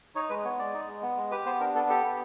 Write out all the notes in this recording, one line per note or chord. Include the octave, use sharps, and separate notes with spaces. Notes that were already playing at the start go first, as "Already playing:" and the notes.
D#4 C#5
G#3 B4
B3 C#5
G#3 D5
D#4
G#3
B3
G#3
G4 B4
B3 C5
D4 A#4
B3 A4
G4 A4
B3